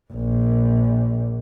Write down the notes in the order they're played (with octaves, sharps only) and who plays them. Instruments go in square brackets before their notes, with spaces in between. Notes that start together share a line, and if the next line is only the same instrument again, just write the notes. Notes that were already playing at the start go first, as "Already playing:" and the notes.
[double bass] A#1